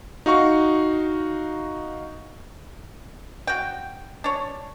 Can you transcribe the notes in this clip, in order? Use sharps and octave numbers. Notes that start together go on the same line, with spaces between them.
D#4 F#4 F5 C#6
F#4 G5
D4 C#5